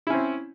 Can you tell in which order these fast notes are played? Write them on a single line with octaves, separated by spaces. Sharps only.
E4 C#4 C4